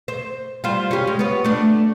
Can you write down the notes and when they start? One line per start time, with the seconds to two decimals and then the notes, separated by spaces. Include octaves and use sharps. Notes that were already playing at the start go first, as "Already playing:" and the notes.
0.08 C5
0.64 G3 F4 C5
0.91 C#4 G4
1.07 G#3
1.19 B3 C#5
1.44 A3 D4